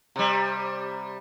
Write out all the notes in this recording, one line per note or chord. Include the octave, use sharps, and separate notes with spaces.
C3 G3